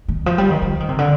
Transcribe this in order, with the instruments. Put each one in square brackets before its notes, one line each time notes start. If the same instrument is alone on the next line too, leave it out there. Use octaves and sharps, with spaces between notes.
[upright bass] D#3
F3
G3
D#3
F3
D#3
C3
D3